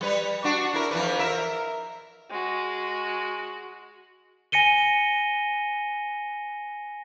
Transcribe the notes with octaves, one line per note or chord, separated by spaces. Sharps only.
G3 B4
D4 F#4
E4 A#4
F2 E3 B4
A#4 E5
G#3 F#4
G#5 A#6 C#7 D#7 G7